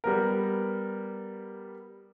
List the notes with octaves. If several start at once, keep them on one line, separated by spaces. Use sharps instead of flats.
G3 B3 A#4